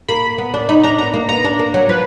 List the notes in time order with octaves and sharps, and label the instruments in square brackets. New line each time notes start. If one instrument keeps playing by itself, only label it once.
[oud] A#3 [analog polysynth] B5
[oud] B3
D4
[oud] D#4 [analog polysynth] B5
[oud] D4 [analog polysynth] A#5
[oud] B3 [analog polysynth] A#5
[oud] A#3
[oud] B3 [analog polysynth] A#5
[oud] D4
A#3
F#3
[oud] F3 [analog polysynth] B4